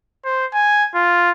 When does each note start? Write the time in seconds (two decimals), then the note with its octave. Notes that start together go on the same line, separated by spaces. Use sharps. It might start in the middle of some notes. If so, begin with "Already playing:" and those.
0.24 C5
0.53 G#5
0.94 F4